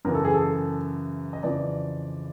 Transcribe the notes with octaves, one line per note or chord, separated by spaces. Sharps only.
F#2 C#3 E3 A#4
A4
G#4
A4
D#5
F2 C#3 E3 D5